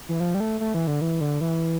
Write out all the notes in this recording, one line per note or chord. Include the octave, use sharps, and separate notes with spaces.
E3
F3
G3
A3
A3
E3
D3
E3
D3
E3